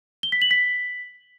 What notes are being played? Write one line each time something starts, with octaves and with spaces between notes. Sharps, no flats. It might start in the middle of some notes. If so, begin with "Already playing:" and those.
G7
B6
F#7
B6